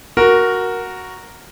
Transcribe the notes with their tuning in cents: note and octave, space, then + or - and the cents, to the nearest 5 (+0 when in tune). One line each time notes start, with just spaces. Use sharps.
F#4 +0 A#4 +0